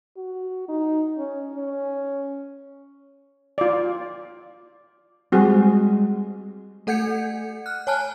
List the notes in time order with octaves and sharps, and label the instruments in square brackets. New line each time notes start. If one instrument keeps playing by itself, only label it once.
[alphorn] F#4
D#4
C#4
C#4
[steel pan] F4 D5
[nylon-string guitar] G3 G#3 [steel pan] C4 F#4 G#4
[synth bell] A3 A4 F#5 G6 G#6 C#7
F6 F#6
C#5 G#5 A5 F6 F#6